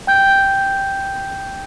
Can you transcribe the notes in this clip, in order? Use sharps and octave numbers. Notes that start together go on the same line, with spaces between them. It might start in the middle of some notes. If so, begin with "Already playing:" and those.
G5 G6